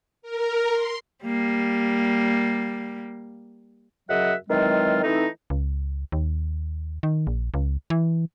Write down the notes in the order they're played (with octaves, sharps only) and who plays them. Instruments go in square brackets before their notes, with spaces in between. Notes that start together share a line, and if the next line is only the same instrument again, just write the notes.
[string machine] A#4
C6
[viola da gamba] G3 A#3
[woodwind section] F#2 C#3 F#3 D#5 E5 F#5
D#3 E3 F#3 G#3 C4 F4
E3 A3 C4 D#4
[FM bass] C#2
D#2
D#3
A#1
C#2
E3